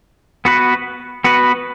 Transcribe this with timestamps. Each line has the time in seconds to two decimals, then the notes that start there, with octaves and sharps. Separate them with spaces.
0.45 B3 F#4 B4
1.24 B3 F#4 B4